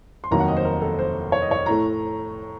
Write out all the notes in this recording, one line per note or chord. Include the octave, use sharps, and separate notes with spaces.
C6
F1 D#2 D#3 F#3 A#3 A#5
F#5
D#5
C5
A#4
A4
C5
C#5
D#5
C#5
A2 A3 A#5